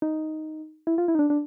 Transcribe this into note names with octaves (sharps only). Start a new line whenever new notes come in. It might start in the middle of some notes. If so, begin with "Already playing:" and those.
D#4
E4
F4
E4
D#4
D4
D4